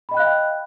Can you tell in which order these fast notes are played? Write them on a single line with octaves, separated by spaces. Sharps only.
B5 D#5 G5 F#6 F5